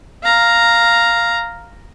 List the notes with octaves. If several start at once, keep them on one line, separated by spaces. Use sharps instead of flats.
F5 A#5